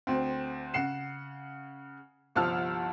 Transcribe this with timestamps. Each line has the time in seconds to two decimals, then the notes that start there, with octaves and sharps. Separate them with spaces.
0.07 D2 C4
0.74 C#3 F#5 C7 E7
2.35 G1 C2 F3 A5 E6 F6